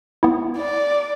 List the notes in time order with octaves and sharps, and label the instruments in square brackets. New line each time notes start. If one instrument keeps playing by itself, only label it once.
[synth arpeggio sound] B3 E4
[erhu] D5